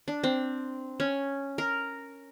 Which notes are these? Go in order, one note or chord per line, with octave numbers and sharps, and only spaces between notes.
D4
C4
C#4
A#4